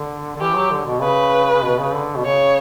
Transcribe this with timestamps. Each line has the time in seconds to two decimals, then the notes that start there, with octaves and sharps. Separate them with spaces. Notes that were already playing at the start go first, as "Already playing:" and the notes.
Already playing: D3
0.36 D3
0.41 E3 G4
0.55 F#3
0.71 D3
0.86 B2
1.02 C#3 B4
1.53 C#3
1.63 B2
1.79 C#3
1.94 D3
2.16 B2
2.25 C#3 C#5